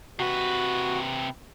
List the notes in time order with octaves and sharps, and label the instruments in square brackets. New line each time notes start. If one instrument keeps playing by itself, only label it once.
[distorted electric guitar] C3 B4 [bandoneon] F#4